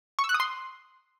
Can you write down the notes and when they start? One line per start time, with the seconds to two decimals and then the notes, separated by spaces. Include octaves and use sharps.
0.19 C#6
0.24 E6
0.29 F#6
0.34 D#6
0.40 C6